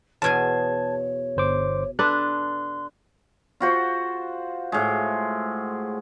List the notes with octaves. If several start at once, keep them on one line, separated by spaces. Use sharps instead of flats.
E2 B2 G#4 C#5 A5 G#6
G1 C5 D6
D4 A4 B4 C6 F#6
F4 F#4 C5
A2 G#3